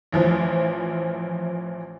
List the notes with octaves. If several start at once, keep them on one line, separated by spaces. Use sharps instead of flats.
A1 E3 F3